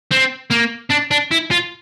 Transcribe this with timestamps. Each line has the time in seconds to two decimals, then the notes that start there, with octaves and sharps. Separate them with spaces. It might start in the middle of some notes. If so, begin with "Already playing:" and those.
0.12 C4
0.51 A#3
0.91 D4
1.11 D4
1.31 E4
1.51 F4